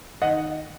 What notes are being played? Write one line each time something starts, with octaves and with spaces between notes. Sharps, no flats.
D#3 D#5 F#5